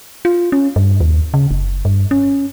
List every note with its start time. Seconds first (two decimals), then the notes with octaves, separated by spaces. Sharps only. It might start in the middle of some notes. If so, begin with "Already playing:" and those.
0.25 F4
0.52 C#4
0.76 G2
1.01 D#2
1.34 C#3
1.51 F#1
1.85 G2
2.11 C#4